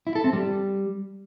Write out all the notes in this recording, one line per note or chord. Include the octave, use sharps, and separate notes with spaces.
E4
A4
C4
G3